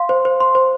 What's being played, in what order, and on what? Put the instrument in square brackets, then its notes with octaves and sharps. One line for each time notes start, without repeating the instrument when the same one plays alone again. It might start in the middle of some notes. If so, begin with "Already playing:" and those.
Already playing: [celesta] F5 C6
C5
C5
C6
C5